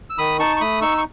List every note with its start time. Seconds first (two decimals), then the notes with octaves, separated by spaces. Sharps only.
0.10 E6
0.18 D#3 B5 D#6
0.39 D#4 A5 C#6
0.56 C#6
0.61 A3 B5 D#6
0.82 D#4 C#6 E6
0.98 C#6